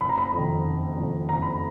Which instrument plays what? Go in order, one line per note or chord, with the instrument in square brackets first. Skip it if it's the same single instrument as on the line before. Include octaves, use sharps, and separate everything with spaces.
[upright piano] F#1 B5
A#5
B5
F2
D#3
F#1
F2 D#3
F#1 A#5
B5